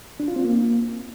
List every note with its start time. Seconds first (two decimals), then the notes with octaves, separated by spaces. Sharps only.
0.20 D4
0.28 F4
0.36 C4
0.44 A#3